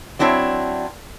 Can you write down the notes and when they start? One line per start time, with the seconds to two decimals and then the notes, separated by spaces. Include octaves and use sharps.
0.19 F#3 C4 D4 E4 C#5